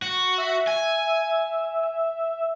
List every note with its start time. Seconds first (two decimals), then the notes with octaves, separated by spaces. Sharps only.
0.02 F#4
0.38 E5
0.67 G#5